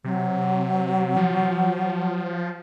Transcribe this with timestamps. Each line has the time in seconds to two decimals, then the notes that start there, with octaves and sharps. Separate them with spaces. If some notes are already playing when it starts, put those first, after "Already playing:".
0.04 C3 F#3
1.17 F3